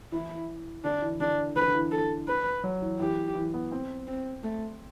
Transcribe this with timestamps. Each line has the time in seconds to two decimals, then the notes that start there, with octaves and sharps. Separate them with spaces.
0.12 E3 E4
0.84 D3 D4
1.02 E3
1.20 D3 D4
1.56 D3 B4
1.68 D3
1.75 E3
1.92 A4
2.28 B4
2.64 F#3
2.82 E3
3.00 E3 G4
3.35 E3
3.54 B3
3.72 C4
4.07 C4
4.43 A3